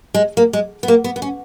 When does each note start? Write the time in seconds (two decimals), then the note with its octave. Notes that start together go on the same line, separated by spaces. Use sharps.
0.14 G#3
0.37 A#3
0.53 G#3
0.83 B3
0.88 A#3
1.04 B3
1.16 B3
1.22 C#4